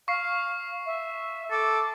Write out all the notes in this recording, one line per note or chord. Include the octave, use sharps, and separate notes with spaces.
F5 C#6 C7
E5
A4 D6